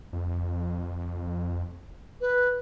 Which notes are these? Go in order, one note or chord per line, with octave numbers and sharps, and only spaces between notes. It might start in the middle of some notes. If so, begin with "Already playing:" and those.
F2
B4